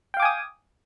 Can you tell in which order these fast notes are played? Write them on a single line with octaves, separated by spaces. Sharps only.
G5 F5 D6 G#5 D#6